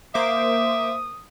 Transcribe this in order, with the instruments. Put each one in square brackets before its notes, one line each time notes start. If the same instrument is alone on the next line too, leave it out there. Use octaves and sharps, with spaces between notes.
[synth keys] A#3 C5 D6 [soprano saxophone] E5 [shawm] D#6